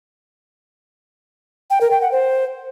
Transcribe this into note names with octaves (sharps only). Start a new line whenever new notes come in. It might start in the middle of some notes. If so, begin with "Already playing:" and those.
G5
A#4
G5
F#5
C5